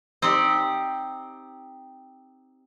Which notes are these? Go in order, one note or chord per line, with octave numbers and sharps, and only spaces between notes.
C4 D#4 G4 D5